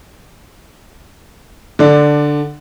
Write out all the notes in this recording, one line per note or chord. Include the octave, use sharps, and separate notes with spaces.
D3 D5